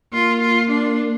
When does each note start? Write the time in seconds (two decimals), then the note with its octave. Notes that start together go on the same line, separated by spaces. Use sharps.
0.13 A#3 F4
0.41 F4
0.71 D4